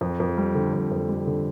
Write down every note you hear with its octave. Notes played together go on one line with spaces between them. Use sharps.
F2
F2
G3
D3
F2
F2
G3
D3